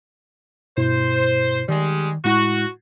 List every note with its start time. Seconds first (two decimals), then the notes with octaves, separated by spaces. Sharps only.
0.77 G2 B2 E4 C5
1.69 D#3 G3 G#3
2.24 A2 G#3 E4 F#4